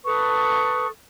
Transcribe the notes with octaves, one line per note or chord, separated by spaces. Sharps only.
A4 B4 C#6 D#6